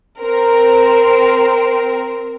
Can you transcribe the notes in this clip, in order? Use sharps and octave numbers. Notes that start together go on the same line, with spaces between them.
C4 A#4